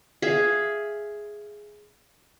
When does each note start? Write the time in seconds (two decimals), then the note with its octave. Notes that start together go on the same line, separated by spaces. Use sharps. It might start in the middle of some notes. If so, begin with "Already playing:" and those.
0.22 G#4 E5 F5